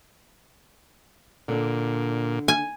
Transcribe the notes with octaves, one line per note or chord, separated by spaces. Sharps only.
A#2 D3 D4
G#5